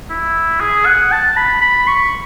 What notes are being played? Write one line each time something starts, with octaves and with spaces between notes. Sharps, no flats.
E4
G#4
F#5
A5
B5
B5
C#6